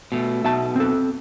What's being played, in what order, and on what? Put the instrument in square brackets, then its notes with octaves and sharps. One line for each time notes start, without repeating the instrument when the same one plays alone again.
[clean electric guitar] B2 A3
[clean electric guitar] B1 B2 [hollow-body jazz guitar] E5 A5
[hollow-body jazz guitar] C4 A4